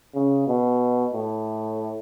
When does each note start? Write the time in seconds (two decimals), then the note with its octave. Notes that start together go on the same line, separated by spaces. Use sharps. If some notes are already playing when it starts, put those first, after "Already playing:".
0.15 C#3
0.47 B2
1.13 A2